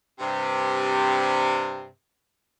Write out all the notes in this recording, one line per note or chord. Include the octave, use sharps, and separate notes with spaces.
G2 C3